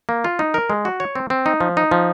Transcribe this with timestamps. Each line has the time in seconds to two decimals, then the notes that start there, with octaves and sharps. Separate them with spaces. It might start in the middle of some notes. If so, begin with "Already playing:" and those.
0.09 A#3
0.24 F4
0.39 D#4
0.54 A#4
0.70 G#3
0.85 F#4
1.00 C#5
1.16 C4
1.30 C4
1.46 D#4
1.61 F3
1.77 D#4
1.91 F3